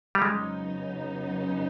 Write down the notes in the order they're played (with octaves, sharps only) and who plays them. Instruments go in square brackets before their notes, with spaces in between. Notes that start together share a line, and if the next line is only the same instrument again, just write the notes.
[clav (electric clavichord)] G3
[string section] F2 C#3 F#3 B3 D#4 [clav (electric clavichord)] G#3